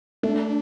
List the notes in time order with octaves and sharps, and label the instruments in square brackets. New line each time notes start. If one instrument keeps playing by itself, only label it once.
[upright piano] A3 [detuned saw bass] D4